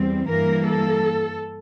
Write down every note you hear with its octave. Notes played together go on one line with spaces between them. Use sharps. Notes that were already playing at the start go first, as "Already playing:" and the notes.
Already playing: E2 G3 C4
G2 E3 A#3 A#4
A4